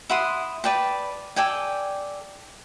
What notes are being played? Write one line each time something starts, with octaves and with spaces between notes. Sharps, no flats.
E4 F#5 C6 D#6
B4 D5 G5 A5
A4 D5 G5 G#5